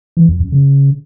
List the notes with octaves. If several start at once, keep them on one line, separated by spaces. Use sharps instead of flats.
E3
F2
F#2
C#3